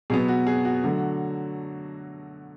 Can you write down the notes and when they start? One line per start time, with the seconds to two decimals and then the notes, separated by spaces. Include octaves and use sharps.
0.10 B2 F#3 B3 G#4
0.28 F#4
0.47 G#4
0.65 F#4
0.84 D3 F#3 A3